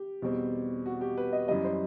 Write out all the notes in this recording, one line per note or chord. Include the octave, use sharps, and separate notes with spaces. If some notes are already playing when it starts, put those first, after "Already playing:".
Already playing: G4
E2 B2 G3 C4
F#4
G4
B4
D#5
F#2 E3 G3 D#5
C5